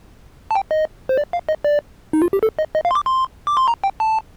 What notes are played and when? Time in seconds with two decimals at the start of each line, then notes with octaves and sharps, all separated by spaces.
0.51 A5
0.55 G5
0.71 D#5
1.09 C5
1.17 D5
1.33 F5
1.49 D#5
1.64 D5
2.13 D#4
2.22 F4
2.33 G4
2.43 A4
2.59 D#5
2.75 D#5
2.85 F5
2.91 C6
2.95 D6
3.06 C6
3.47 D6
3.57 C6
3.68 A#5
3.84 G5
4.00 A5